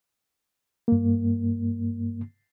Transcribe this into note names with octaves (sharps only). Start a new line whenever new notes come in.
G2 A#3